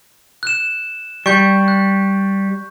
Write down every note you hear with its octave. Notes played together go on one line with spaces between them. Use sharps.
F#6 E7
G3 C#6 G6
F#6